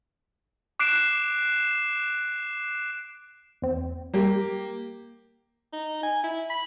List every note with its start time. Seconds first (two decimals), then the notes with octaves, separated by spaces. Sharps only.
0.80 D6 F#6 C7 D7 E7
3.62 E2 C4
4.14 G3 A#3 G4
5.73 D#4
6.03 G#5
6.24 E4
6.50 B5